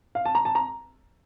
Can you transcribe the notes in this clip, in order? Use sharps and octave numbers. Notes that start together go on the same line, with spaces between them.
F5
A5
A#5
A5
A#5